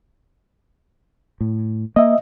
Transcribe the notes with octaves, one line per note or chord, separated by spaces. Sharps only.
A2
A#3 D#5 E5